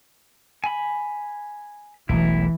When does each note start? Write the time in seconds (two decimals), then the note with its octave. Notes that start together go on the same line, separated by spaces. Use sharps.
0.64 G#5 B5
2.09 E1 B1 E3 A3 E4